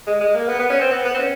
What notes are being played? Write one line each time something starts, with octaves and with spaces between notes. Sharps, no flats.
G#3
G#3
A#3
B3
B3
C#4
C4
B3
B3
C4
C#4